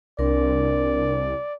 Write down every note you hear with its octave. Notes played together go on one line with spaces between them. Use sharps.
C2 C4 D4 A#4 D5